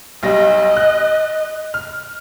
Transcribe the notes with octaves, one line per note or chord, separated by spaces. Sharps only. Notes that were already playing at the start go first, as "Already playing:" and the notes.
B1 G3 D#5 A#6
F#6
F6